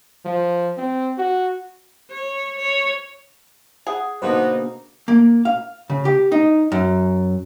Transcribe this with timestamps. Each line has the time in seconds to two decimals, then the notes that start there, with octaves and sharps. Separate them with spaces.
0.25 F3
0.77 C4
1.18 F#4
2.11 C#5
2.59 C#5
3.87 G#4 F#5
4.22 B2 D3 A#3 B3 D#4 C5
5.08 A#3
5.45 F5
5.90 C#3
6.05 G4
6.32 D#4
6.72 F#2